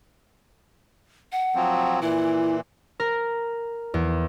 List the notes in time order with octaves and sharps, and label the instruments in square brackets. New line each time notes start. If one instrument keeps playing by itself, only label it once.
[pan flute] F#5
[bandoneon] F3 F#3 C4
[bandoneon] A#2 E3 [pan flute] E4
[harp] A#4
E2